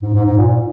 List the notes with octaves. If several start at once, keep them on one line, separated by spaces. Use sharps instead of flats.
G#2
G#2
G#2
A#2